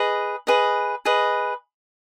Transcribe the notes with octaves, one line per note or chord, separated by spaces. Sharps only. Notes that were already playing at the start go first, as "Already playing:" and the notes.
Already playing: G#4 B4 D#5
G#4 B4 D#5
G#4 B4 D#5